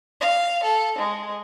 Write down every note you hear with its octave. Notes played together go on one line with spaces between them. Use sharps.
F5
A4
G#3